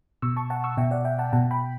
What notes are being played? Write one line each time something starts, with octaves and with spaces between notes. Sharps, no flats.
B2 C#6 E6
A5 C#6
F#5 A5
C#6 E6
B2 E5 G5
D5 F#5
E5 G5
F#5 A5
B2 F#5 A5
G5 B5